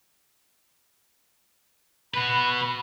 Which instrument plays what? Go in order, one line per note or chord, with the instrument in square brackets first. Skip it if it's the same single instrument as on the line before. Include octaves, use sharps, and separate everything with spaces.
[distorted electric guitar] F#4 B4 [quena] B5